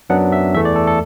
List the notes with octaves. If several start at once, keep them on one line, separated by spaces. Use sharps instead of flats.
F#2 F#3 B3 D4 F#5
E5
E2 E3 A3 E5
D5
A4
A4